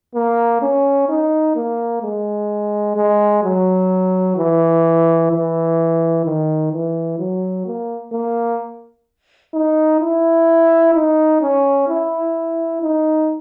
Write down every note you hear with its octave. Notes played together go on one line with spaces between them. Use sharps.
A#3
C#4
D#4
A#3
G#3
G#3
F#3
E3
E3
D#3
E3
F#3
A#3
A#3
D#4
E4
D#4
C#4
E4
D#4